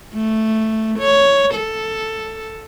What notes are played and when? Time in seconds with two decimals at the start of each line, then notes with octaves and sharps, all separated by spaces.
0.14 A3
0.99 C#5
1.55 A4